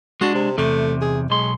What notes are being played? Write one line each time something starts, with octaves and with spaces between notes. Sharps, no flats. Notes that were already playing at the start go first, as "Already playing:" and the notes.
G#3 D4 F#4
C3
E2 C3 A3
G#4
B1 G#3 C6